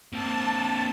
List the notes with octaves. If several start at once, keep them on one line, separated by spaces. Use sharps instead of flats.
A#3 C4 A5